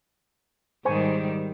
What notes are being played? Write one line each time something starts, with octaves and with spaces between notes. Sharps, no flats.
G#2 D#3 G3 C5 G#5 C#6